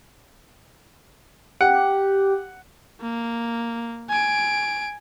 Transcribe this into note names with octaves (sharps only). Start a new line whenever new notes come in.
G4 F#5
A#3
G#5 D7